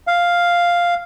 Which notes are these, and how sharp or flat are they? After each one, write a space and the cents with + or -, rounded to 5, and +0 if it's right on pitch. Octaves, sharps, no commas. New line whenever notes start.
F5 +0